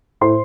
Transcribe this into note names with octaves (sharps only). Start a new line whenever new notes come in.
A2 C5 C6